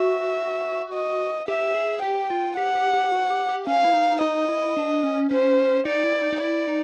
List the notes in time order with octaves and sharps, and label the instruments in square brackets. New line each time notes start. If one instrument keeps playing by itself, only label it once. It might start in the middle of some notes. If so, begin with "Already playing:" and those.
Already playing: [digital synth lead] F#4 [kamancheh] E5
[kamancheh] D#5
[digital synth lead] G4 [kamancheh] E5
[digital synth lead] G#4
[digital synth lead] G4 [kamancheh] G5
[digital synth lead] F4
[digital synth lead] G4 [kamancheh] F#5
[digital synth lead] G4
G4
F#4
G4
G4
[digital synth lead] C#4 [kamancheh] F5
[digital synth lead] E4
D#4
[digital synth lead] D#4 [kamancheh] D#5
[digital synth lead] E4
D4
C#4
[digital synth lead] C#4 [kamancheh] C5
[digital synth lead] D#4 [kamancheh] D5
[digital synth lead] E4
D#4
D#4
[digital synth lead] E4 [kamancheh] D5
[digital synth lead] D#4